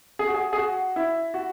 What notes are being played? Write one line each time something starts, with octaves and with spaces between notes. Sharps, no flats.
G#4
F#4
G#4
G#4
F#4
E4
F#4